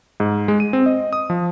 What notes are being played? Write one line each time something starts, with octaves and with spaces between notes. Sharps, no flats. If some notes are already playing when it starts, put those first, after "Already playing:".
G#2
G#3
D#7
C4
D#5
D#6
F3